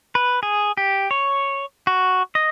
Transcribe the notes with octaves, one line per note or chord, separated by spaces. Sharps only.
B4
G#4
G4
C#5
F#4
D#5